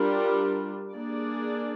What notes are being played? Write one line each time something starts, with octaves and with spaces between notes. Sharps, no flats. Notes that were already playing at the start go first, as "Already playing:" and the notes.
Already playing: G3 D4 F4 A#4
A#3 D4 G#4 D5